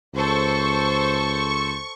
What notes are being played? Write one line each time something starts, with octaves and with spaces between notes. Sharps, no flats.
C#2 A4 C5 C#6